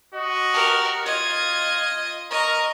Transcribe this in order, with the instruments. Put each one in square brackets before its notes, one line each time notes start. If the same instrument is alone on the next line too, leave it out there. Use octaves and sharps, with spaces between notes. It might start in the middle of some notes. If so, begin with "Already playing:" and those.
[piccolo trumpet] F#4 [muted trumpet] D#5
[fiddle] G4 A#4
[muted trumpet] F4 [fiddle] D#5 [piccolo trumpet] G#6
[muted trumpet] A#4 [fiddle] D#5 C#6 [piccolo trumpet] A#5